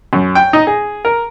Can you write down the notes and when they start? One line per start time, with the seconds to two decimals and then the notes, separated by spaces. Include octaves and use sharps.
0.13 F#2
0.35 G5
0.53 D#4
0.67 G#4
1.05 A#4